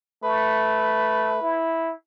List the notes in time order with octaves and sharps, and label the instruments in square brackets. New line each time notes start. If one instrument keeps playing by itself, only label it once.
[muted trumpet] A3 [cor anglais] B4
[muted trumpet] E4